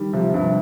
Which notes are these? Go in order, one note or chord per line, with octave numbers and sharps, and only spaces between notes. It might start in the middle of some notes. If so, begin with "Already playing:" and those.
Already playing: D#3 G3
C3 F3
G2 C3